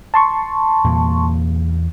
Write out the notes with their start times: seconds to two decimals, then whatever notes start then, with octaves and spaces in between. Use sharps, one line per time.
0.14 A5 C6 C#6
0.84 E2 A#2 A#3